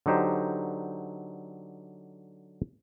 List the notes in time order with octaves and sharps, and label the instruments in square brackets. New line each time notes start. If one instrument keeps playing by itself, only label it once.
[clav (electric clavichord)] D3 F#3 D#4 G4 C5